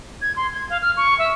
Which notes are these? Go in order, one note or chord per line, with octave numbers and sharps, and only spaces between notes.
G#6
C6
G#6
F5
F6
C#6
E5